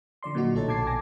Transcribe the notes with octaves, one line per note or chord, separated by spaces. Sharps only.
D3 F3 D5 C6
A#2 D3 F#3 D#4 F#4
B1 A3 D#4 A4 C#5 A6
A#1 B2 A5 D6 G#6 C7
G#5 A5 D6 A#6